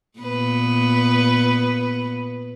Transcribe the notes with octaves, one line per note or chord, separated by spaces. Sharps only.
A#2 B3 B4